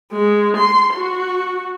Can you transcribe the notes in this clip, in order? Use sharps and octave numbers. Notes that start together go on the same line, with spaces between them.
G#3
C6
F#4